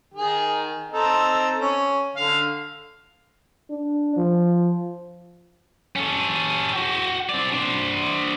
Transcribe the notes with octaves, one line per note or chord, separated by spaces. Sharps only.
D#3 G#4
C4 D#4 A4
C#4
D3 F5
D4
F3
C#4 A4
F#4 G5
C4 D5
D4 C5